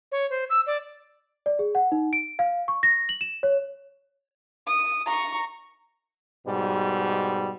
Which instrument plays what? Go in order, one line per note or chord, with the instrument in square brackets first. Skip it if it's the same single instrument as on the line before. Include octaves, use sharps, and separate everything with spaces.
[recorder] C#5
C5
E6
D5
[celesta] D5
G#4
F#5
D#4
D7
F5
C#6
A#6
F#7
E7
C#5
[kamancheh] D#6
A#5 C#6
[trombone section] G#2 B2 G3